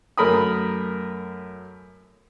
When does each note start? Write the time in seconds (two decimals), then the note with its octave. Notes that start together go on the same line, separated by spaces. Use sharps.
0.17 F#2 A3 A#4 B5 D#6